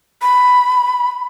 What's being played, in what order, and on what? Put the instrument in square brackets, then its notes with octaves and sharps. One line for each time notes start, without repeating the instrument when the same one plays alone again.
[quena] B5